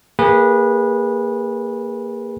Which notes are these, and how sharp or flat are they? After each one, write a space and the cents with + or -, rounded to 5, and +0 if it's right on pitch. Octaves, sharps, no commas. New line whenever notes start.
A#3 -10 G#4 -35 B4 -20